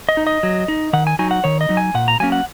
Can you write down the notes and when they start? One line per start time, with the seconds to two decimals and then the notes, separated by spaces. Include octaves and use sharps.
0.09 D#5
0.17 D#4
0.27 D#5
0.43 F#3
0.68 D#4
0.93 D#3 F#5
1.07 G#5
1.19 F#3 D#4 G#5
1.31 F#5
1.44 D#3 C#5
1.61 D#5
1.69 F#3 D#4
1.77 G#5
1.94 A#2 F#5
2.08 A#5
2.20 F#3 A#3 C#4 G#5
2.32 F#5